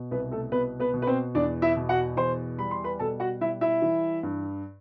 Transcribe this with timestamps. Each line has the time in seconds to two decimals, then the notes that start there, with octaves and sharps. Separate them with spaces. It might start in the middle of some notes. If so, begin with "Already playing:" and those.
Already playing: B2
0.11 C2 B3 B4
0.31 A3 A4
0.52 B2 B3 B4
0.80 B3 B4
0.94 B2
1.02 B4
1.07 C4 C5
1.35 E2 D4 D5
1.62 E4 E5
1.76 B2
1.89 F#4 F#5
2.17 E2 C5 C6
2.58 G3 B5
2.71 C6
2.84 B4 B5
2.99 B2 A4 A5
3.20 F#4 F#5
3.41 G3 E4 E5
3.61 E4 E5
3.82 E3
4.23 G2